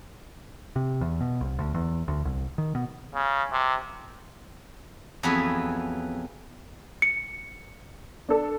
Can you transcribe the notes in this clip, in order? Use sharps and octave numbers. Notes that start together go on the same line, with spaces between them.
C3
E2
B2
C2
D2
E2
D2
C2
D#3
B2
C#3
C3
F2 E3 F#3 B3 G#4 B4
C#7
D4 A4